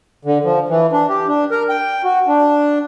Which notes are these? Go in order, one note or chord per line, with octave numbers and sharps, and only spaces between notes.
D3
F3
E3
D4
G4
D4
A#4
G5
F#4
D4